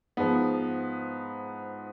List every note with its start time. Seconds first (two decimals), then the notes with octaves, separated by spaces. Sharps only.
0.17 G#2 F3 B3